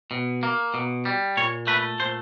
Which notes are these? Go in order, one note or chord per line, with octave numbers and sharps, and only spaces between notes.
B2
A#3
B2
G3
A#2 C#5
A3 B4
A#2 C5